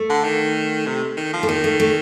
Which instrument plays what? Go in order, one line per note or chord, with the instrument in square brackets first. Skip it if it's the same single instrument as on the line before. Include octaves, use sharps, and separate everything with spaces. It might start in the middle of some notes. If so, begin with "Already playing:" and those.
Already playing: [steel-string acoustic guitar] A3
[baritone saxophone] D3
D#3
C3
D#3
F3
[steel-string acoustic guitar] A3
[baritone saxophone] D#3 [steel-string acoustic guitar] A#3
[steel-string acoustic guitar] A3
A3